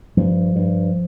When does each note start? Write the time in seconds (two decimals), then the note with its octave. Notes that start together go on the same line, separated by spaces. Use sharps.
0.17 G2 F3
0.56 G2